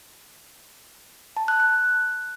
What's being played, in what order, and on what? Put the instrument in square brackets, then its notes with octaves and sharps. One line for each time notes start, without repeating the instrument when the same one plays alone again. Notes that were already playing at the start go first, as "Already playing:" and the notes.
[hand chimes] A5
F#6
F#6